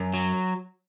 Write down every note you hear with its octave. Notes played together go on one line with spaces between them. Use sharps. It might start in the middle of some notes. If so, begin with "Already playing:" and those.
Already playing: F#2
F#3